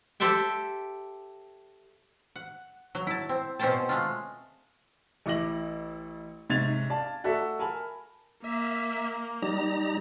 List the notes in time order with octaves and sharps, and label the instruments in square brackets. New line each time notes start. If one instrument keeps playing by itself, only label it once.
[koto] G4 A4 C5 E5 G5
F#5
F#3
E4 A5
C4
B2 C4 C#4 C5 G5 A5
G#3 A3 F4
[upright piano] A1 E4 D6 A#6 F#7
G#2 C3 C#4 G#6 A6 F7
D5 F5 A5
A3 F#4 A4 D5 E5
A#4 G#5 A5 B5
[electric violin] A#3 [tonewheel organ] E5
[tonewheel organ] G3 D#4 A#5